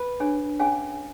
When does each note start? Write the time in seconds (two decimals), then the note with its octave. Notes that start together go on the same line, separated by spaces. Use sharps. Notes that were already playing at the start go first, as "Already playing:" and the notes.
Already playing: B4
0.20 D4 G#4 C#5
0.59 C#4 G#4 C#5 F5 G#5